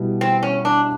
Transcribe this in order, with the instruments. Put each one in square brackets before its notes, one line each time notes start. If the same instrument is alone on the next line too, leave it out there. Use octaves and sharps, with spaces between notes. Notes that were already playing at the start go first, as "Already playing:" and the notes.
Already playing: [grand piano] B2 G3 B3 E4
[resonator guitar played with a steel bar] C4
C#4
D4